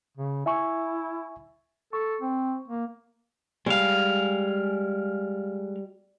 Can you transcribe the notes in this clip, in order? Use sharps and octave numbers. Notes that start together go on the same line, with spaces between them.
C#3
E4 E5 G#5 C#6
A4 C#6
C4
A#3
G3 G#3 F5